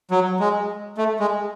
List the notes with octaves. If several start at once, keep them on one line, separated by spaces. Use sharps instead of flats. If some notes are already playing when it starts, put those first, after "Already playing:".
F#3
G#3
A3
G#3